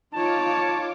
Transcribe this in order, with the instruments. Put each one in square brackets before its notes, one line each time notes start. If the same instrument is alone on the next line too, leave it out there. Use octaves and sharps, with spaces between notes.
[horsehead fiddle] D#4 C#5 [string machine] F4 D6 [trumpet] A5